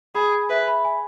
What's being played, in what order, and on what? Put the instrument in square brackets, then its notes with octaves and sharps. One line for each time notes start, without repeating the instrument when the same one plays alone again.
[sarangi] G#4 [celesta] B5
[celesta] G#5
[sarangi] B4 [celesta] E5
[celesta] B5
G#5